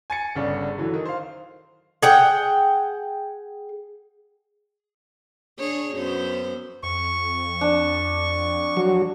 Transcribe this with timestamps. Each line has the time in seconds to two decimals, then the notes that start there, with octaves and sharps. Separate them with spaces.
0.10 G#5 A6 C#7
0.35 G1 C#3 D4
0.78 D3 E3 F#3
0.94 D#3
1.05 C5 F5
2.02 G#4 F#5 G5
5.59 D4 G#4 C#5
5.95 F#2 B3 C5
6.83 F2 C#6
7.61 D4
8.77 F#3